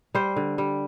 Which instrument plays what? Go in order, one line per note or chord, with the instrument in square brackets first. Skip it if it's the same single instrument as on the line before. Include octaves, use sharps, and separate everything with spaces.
[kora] G3 C5
D3
G3